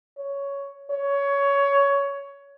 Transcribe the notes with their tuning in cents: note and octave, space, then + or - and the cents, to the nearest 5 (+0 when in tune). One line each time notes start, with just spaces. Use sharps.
C#5 +10
C#5 +15